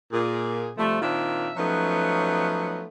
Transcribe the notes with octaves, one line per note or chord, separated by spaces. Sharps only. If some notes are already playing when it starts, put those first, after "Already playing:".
A#2 G#4
C3 F3 G3 A3
A#2 D#3 C4 D4 F4 E5
F3 F#3 A3 B3 C#4 D#4